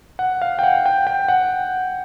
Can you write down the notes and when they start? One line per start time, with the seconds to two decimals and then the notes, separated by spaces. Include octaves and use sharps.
0.19 F#5
0.42 F5
0.59 G5
0.63 F#5
0.86 G5
1.07 G5
1.28 F#5